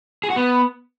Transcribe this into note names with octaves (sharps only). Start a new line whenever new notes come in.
G#4
F#4
B3